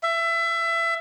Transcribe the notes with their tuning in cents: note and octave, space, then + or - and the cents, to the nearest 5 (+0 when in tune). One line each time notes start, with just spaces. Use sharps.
E5 +25